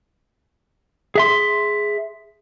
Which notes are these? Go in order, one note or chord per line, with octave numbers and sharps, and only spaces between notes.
G#4 E5 C6